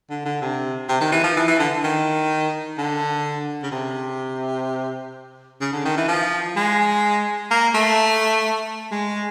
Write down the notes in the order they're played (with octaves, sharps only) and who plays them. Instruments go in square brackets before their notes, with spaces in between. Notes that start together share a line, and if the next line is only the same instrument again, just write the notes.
[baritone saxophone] D3
D3
C3
C3
D#3
E3
F3
E3
E3
D3
D#3
D3
C#3
C3
C#3
D3
D#3
E3
F3
G#3
A#3
A3
G#3